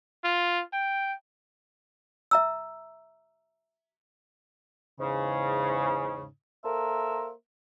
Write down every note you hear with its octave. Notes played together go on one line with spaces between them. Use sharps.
F4
G5
E5 A#5 E6
E2 G#2 C#3
A#3 A4 A#4 C5 E5